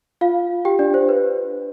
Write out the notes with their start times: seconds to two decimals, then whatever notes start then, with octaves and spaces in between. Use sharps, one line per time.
0.21 F4 F5
0.65 G4 G5
0.79 D4 D5
0.94 C5
1.09 B4